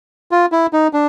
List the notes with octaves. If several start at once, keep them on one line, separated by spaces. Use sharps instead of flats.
F4
E4
D#4
D4